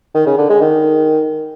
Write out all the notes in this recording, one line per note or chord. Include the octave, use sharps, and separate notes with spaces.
D#3
C#3
D3
G#3
D#3